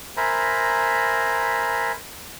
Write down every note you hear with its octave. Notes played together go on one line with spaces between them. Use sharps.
A#4 C5 E5 G#5 A#5 B5